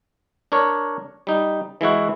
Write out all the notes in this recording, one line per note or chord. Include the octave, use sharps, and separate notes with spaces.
D4 A#4 C#5
G3 D#4
E3 G#3 E4 F#4